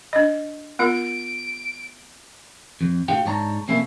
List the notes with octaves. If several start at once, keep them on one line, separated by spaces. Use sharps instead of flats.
D4 D#5
B3 F4 A#4 D7
F2
A2 D4 F#4 G4 F5 G5
G#2 D4 C#5 A5 A#5
F2 C3 A3 A#3 C#4 E4